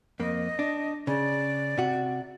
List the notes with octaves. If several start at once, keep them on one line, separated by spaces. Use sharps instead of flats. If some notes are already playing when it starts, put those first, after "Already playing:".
F2 A#3 D#5
D4
C#3 D5
C3 F#4